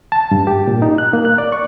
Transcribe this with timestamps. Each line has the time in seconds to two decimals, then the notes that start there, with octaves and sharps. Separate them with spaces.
0.12 A5
0.31 G2
0.47 G4
0.68 A#2
0.82 D#4
0.98 F#6
1.13 A#3
1.25 F#6
1.38 D5
1.52 C#6